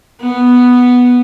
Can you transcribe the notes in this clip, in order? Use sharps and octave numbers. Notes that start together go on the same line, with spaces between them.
B3